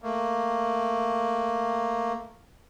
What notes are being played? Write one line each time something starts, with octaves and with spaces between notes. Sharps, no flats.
A3 A#3